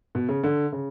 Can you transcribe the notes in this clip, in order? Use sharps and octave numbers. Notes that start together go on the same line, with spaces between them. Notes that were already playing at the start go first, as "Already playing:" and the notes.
B2
C#3
D3
C#3